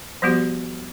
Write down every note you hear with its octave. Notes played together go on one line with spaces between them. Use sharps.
F3 G3 B3 F#4 G4